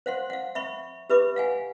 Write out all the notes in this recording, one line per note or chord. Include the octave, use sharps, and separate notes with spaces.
C5 F5 F#5 C6
F5 F#5
E5 B5 C#6
G4 B4 E5 B5 D6
F5 F#5 G#5